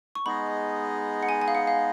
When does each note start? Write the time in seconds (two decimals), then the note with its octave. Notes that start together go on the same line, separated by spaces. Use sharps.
0.15 C#6
0.26 G#3 B3 D#4 G#4 D#5 B5
1.23 F#5
1.29 G#5
1.42 G#5
1.48 F5
1.55 F#5
1.67 F5